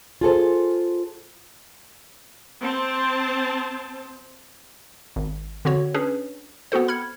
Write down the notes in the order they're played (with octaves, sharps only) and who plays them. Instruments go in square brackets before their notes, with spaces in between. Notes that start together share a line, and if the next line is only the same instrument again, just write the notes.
[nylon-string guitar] F4 G#4 A4 C5
[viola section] C4 C5 A5
[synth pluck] G#1
D3 C4 F#4 C#5
C#4 D4 G#4 B4 C#5
B3 C4 F#4 A4 C5
B5 F6 G#6 C#7